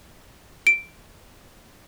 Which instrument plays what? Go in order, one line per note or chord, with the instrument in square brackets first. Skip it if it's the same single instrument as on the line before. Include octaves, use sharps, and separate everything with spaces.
[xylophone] D7